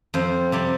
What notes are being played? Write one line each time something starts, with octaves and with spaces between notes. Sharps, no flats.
F2 C5
C3 G3